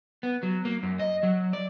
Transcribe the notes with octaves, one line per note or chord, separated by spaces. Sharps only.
B3
F#3
A#3
F#2
D#5
F#3
D5